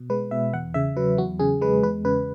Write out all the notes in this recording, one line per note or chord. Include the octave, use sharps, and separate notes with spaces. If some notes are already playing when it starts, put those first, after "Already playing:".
Already playing: B2
G#3 B4
B2 E5
E2 F#5
C#3 E5
F#3 B4
E2 F#4
C#3 G#4
G#3 B4
E2 B4
C#3 B4